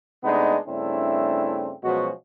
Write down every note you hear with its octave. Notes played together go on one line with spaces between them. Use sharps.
C3 G#3 A3 B3 D4 D#4
G2 C#3 A3 C4 D4 E4
B2 F3 F#3 G#3 C#4 F#4